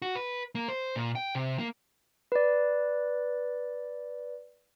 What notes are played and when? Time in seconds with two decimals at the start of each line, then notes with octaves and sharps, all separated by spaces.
0.02 F#4
0.16 B4
0.55 A#3
0.68 C5
0.96 A#2
1.15 G5
1.35 C3
1.59 A#3
2.32 B4 D5